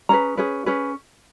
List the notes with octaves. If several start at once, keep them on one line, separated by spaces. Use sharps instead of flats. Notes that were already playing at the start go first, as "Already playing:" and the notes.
C#4 G#4 B4 A#5
C#4 G#4 B4
C#4 G#4 B4